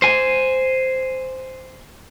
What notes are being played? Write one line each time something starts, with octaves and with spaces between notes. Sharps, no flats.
C5 G#5